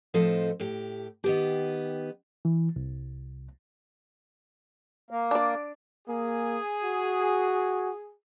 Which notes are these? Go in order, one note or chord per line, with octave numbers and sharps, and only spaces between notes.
A2 F3 C4 A4 C5 D#5
A2 G4
D#3 B3 G4
E3
C2
A#3
D4 D5
A#3 G#4
F#4